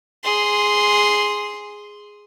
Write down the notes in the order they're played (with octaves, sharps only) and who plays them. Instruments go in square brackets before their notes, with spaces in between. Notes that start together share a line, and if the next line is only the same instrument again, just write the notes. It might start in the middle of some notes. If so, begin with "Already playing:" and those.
[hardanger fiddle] G#4 C6